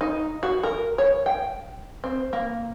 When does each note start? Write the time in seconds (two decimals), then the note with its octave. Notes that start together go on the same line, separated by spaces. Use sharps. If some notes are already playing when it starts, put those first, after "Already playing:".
0.01 D#4
0.43 F#4
0.63 A#4
0.98 C#5
1.26 G5
2.04 C4
2.33 A#3